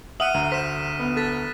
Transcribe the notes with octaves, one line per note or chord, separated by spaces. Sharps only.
E5 F#5 D#6 F6 D#7 F#7
D2 A#5
C5 B6 E7
B3
A4 F#6 A6 B6